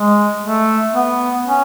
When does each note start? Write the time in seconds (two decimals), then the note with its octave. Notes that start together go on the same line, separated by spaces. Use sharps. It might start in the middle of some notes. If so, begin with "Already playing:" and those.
Already playing: G#3
0.43 A3
0.95 B3
1.47 C#4